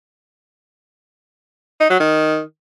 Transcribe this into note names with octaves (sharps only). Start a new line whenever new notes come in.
D#4
F#3
D#3